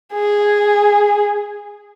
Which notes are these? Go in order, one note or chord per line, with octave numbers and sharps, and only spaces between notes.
G#4